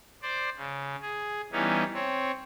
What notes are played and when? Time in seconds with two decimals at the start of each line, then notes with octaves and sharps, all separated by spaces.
0.22 C5 D5
0.56 C#3
1.02 G#4
1.52 E3 G3 B3 C#4 D#4
1.94 C4 C#5